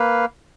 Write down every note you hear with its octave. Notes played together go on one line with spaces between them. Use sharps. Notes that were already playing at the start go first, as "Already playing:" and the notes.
Already playing: A#3 B4 F5